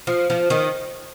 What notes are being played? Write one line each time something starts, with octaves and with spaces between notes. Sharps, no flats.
F3
F3
D#3